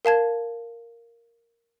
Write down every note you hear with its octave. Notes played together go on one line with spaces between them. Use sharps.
A#4 F5 A5 G#6